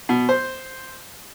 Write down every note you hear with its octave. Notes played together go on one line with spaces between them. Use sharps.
B2
C5